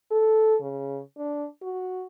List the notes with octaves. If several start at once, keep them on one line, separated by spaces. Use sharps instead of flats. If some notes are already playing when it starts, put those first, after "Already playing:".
A4
C#3
D4
F#4